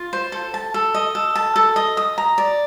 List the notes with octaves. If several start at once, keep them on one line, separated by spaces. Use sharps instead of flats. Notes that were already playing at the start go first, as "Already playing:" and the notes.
Already playing: F4
C5
A4
A5
A4
D#5
A4
A5
A4
D#5
D#6
A#5
D5